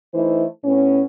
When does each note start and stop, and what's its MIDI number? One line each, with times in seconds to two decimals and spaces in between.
0.14 0.44 52
0.14 0.44 57
0.14 0.44 63
0.14 0.44 64
0.14 0.44 72
0.64 1.02 45
0.64 1.02 59
0.64 1.02 61